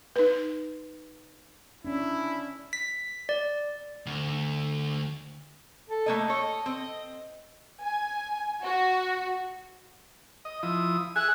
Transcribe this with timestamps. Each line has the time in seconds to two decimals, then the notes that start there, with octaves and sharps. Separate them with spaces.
0.16 D#4 B4
1.85 C#4 D4 E4
2.73 B6
3.29 D5
4.06 D2
5.89 A4
6.06 A3 A#3 D#5
6.28 A4 C#5 D#5
6.66 C4
7.81 G#5
8.65 F#4
10.45 D#5
10.63 F3 E4 D#6
11.16 G#4 E5 G#5 F#6